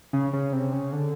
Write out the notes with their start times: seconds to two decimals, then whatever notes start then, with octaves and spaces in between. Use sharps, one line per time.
0.13 C#3
0.33 C#3
0.53 C3
0.73 C#3
0.93 D3